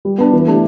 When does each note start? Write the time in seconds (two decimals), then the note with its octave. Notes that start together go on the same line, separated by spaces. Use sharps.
0.05 G3
0.18 B3 D4
0.32 E3
0.47 A3 D4 G4